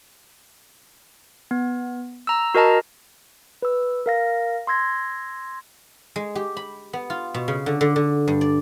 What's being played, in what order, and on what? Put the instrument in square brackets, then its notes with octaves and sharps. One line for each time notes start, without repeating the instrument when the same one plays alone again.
[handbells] B3
A#5 E6
F#4 A#4 D#5 A5 A#5
B4 E6
A#4 F5 A#6
C6 E6 G#6 A#6
[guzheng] G#3
G4
B5
B3
F4
B2
C#3
D3
D3
D3
G2
D5